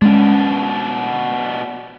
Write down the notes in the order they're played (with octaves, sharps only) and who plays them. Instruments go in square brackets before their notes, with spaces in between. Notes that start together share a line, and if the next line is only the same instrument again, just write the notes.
[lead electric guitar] B2 D4 [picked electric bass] G#3 C#4